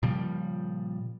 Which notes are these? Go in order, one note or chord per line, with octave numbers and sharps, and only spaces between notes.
A#2 C#3 F3 G3